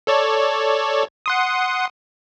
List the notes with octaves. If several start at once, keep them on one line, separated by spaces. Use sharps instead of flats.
A4 C#5 D5
F#5 C6 D#6